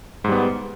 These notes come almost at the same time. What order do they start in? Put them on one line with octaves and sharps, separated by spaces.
G#2 G3 B3